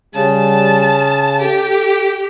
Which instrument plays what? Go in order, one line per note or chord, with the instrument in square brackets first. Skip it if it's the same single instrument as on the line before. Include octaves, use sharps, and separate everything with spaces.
[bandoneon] C#3 [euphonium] G3 [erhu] A5
[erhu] G4 [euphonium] A4